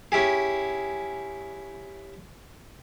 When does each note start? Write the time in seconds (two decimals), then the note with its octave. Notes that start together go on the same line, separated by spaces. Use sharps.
0.12 C#4 E4 G4 G#4